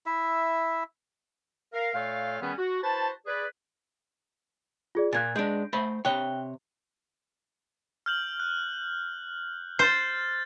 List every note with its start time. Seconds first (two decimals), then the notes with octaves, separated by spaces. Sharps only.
0.06 E4 E5
1.73 A#4 F5
1.95 A#2 A3 A4 C#5 F5
2.41 D#3 G3 B3 C#4 G#4 B4
2.57 F#4
2.83 E4 F#4 B4 C5 A5
3.26 G#4 B4 D5
4.95 F4 G#4 D5
5.13 A#2 A#3 F#6 G#6 A6
5.36 G#3 D4 G6 D7
5.73 A3 C5 B5
6.05 C3 C#5 G5 F#6 G7
8.06 F6 G6 F#7
8.40 F#6
9.79 C5 F6 G6 A6